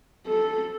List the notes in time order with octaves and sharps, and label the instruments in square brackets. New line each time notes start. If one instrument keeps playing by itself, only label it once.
[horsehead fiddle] A4